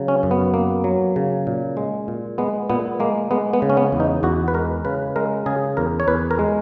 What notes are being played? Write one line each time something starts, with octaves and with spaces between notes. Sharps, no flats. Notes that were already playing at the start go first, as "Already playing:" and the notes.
Already playing: C#3 F#3
C#4
F#2
B3
A#3
F#3
C#3
A#2
G#3
A#2
G#3 B3
A#2 B3
G#3 A#3
G#3 B3
B3
C#3
C#4
B3
E2
D#4
E2 F#4
B4
G#3 A#4
C#3 B4
G#3 A#4
C#3 G#4
E2 A#4
C#5
E2 B4
A#4
G#3